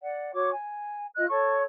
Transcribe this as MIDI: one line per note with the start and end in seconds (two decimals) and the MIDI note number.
0.02 0.32 74
0.02 0.32 78
0.33 0.49 66
0.33 0.49 73
0.33 0.49 86
0.51 1.07 80
1.16 1.26 65
1.16 1.26 75
1.16 1.26 90
1.28 1.63 69
1.28 1.63 73
1.28 1.63 85